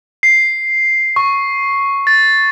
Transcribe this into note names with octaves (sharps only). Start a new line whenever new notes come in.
C7
C#6
A6